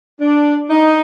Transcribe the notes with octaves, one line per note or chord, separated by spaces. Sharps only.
D4
D#4